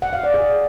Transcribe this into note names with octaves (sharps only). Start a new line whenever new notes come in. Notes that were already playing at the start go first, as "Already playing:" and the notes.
F#5
F5
D5
G#4